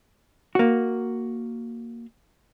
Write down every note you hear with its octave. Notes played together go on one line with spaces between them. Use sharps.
A#3 F#4